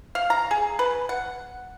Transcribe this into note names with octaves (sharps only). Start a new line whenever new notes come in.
F5
A#5
G#4
B4
F#5